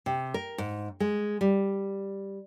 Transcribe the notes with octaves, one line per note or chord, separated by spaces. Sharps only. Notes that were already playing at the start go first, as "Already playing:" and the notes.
C3
A#4
G#2
G#3
G3